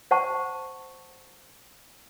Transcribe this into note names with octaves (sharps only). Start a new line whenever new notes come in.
C5 F#5 A5 C#6